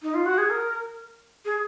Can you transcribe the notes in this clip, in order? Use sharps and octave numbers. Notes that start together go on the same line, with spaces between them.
D#4
F4
F#4
G#4
A#4
G#4